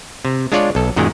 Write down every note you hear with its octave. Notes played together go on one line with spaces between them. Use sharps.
C3
G#3 D4 F4 C#5 D5
B1 A4
F#2 A#2 D#3 G#3